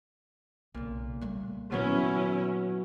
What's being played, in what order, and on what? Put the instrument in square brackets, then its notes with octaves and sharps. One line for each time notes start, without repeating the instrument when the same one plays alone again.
[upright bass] B1 C#3 [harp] A#2
[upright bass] G3 A3
[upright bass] A#2 D#3 [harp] F#3 B3 B4 [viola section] C#4 E4